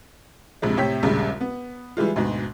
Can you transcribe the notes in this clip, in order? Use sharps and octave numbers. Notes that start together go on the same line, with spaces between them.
A#1 F2 C3 G#3
A2 C3 C#5 G5 B6
A#1 D#2 C#3 G3 G#3
B3
E3 G3 G#3 F4
D2 G#2 B2